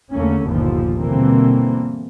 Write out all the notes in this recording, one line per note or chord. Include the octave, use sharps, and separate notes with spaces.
E2 D3 A3 A#3 C#4
G1 D#2 A#2 D3 F3
B2 D3 E3 G3 A#3 C4